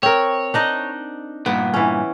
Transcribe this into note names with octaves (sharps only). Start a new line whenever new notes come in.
C4 A#4 C#5
D4 D#4 D#5
G2 A#2 B3
E3 C#4